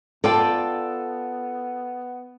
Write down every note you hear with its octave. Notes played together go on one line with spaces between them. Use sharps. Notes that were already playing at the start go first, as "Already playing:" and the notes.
B3 F4 A4 D5 G5